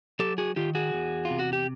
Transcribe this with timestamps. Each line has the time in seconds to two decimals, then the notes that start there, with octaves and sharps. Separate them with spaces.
0.19 F#3 G4 A4
0.38 F#4 G#4
0.56 D#3 F4 G4
0.75 F#4 G#4
0.93 E2
1.25 F4
1.30 C3
1.39 F#4
1.53 G4